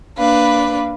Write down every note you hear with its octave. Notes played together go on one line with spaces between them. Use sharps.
A#3 D4 B4 F5